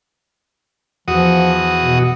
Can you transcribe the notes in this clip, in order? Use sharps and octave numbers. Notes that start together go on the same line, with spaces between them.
E2 F3 F#4 D#6
B2